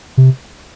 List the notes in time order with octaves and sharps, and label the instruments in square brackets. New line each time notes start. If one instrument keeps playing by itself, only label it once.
[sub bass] C3